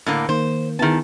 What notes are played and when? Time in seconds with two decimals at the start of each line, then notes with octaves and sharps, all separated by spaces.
0.06 A2 D3 A#3
0.29 D#3 A#3 C5
0.79 D#3 B3 E4 G#4 A5